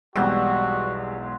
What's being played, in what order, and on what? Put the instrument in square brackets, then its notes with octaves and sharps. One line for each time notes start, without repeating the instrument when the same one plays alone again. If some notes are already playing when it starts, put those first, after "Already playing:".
[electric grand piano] B1 E2 G#3 [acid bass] G3 [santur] C4 F#5 [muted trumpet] F#4